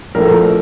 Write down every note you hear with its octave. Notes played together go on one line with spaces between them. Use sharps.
A#1 A2 F3 A3 A#4